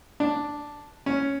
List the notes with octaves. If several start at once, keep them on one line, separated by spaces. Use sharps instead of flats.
D4
C#4